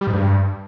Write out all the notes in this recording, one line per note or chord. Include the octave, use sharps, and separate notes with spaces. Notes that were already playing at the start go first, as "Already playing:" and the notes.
G3
G#2
G2